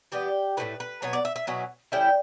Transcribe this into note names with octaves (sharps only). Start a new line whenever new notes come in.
E3 G3 B3 G4
A2 E3 A3 E4 B4
B4
B2 F#3 B3 C#5
D5
E5
E5
B2 F#3 C#4 E4
D3 G3 C#4 E4 G5